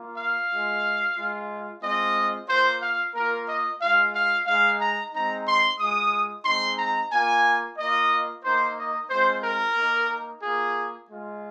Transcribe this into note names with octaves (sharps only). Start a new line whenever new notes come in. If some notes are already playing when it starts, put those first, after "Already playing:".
Already playing: A#3 F4
F5
G#3 F4
G#3 F4
G#3 C4 F4 D#5
A#3 F4 C5
F5
A#3 F4 A#4
D#5
G#3 F4 F5
F5
G#3 D#4 F5
A#5
G#3 C4 D#4 A#5
C6
G#3 F4 D#6
G#3 C4 D#4 C6
A#5
A#3 F4 G#5
A#3 F4 D#5
A#3 D#4 C5
D#5
G#3 C4 F4 C5
A#4
A#3 D#4
A#3 F4 G#4
G#3 F4